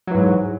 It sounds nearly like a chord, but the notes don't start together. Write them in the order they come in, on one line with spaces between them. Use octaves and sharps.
F#3 E3 G#2